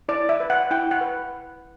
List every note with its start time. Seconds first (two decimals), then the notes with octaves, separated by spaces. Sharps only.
0.08 E4 D5
0.29 E5
0.40 B4
0.50 F#5
0.71 E4 G5
0.91 F#5
1.01 B4